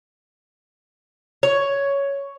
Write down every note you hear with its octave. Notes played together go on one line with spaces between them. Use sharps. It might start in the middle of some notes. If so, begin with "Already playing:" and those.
C#5